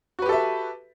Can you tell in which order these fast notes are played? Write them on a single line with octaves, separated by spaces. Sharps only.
F#4 B4 G4 A4 E5